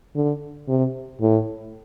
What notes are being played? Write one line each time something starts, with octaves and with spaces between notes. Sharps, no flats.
D3
C3
A2